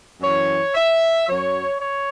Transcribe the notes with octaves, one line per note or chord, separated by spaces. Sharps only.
F#2 E3 C#5
E5
F#2 F#3 C#5
C#5